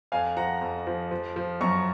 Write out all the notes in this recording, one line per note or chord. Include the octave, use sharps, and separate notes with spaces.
F2 F5 G#5
F3 F#5 A#5
F2
F3
F3
F3
F#2 A#5 C#6